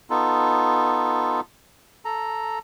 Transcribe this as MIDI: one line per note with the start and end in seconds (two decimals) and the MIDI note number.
0.10 1.41 59
0.10 1.41 63
0.10 1.41 65
0.10 1.41 69
2.05 2.59 69
2.05 2.59 82